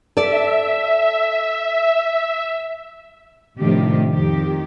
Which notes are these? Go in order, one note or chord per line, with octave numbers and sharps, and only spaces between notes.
A4 D5 E5
A2 C3 D#3 F3 D4 G4
F2 D#3 G4